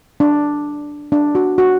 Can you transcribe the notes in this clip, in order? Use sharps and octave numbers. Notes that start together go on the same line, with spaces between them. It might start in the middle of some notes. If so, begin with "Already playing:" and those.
D4
D4
F#4
F#4